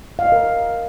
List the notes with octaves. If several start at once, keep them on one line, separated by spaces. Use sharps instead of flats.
F5
D#5
A#4